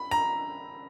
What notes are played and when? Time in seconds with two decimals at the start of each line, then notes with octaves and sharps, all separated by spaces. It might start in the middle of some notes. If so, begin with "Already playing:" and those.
Already playing: B5
0.11 A#5